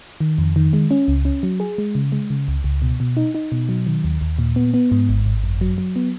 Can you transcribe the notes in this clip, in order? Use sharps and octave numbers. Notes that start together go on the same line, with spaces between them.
D#3
F2
D#3
G#3
C#4
C#2
C#4
F#3
G#4
G#3
C#3
G#3
C#3
C#2
C#2
B2
B2
D#4
D#4
B2
F#3
D#3
D#2
D#2
A#2
B3
B3
G#2
G#1
G#1
F#2
F#3
F#3
B3